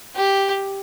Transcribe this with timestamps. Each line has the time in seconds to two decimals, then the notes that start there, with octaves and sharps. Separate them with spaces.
0.16 G4